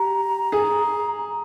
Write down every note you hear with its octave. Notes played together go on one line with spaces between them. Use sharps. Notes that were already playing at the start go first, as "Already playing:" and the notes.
Already playing: G4 A#5
G#4